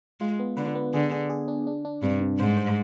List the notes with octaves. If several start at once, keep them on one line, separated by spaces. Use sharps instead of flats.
G#3 F4
B3
D3 B4
B3
D3 G#4
G#4
G#4
D4
D4
D4
G2 C3
C3
G#2 C5
C5